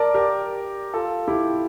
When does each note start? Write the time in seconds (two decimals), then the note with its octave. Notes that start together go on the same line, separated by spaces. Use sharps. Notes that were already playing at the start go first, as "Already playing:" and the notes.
Already playing: A#4 D5 A5
0.14 G4 A#4
0.94 F4 A4
1.28 E4 G4